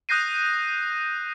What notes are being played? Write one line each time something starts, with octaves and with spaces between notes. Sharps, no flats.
D#6 F#6 G6 A#6 C7 D#7